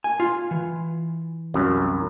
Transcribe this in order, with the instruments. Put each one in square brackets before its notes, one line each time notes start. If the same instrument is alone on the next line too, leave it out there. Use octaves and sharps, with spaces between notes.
[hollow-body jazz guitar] G#5
F4
E3
[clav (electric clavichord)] C2 F#2